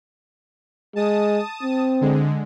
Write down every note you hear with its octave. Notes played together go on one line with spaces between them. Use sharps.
G#3 A5 D#6
C4
D3 G#3